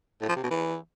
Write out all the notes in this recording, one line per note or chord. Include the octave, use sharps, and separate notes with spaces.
A2
F3
C3
B2
E3